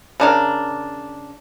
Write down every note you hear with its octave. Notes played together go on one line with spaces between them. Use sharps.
C#3 D4 A#4